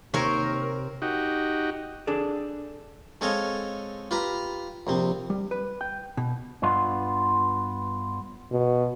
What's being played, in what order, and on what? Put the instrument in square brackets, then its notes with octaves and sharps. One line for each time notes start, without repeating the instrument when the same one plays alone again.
[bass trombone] D#2 [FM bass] C3 [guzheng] C4 A#4 [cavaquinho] C#5 C#6
[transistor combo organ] D#4 F#4 G4
[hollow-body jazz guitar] D4 G#4 A4 D5
[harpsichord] G#3 C4 A4 C#5 D#5 F5
F4 G4 B4 F5 A#5
A#1 C3 C4
[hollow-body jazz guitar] G3
B4
G5
B2
[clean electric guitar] G2 B3 F4
[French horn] B2